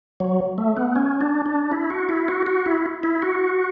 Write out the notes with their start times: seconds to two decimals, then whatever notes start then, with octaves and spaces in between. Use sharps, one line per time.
0.20 F#3
0.58 A3
0.77 B3
0.96 C#4
1.21 D4
1.46 D4
1.71 E4
1.90 F#4
2.09 E4
2.28 F#4
2.46 F#4
2.66 E4
3.03 E4
3.22 F#4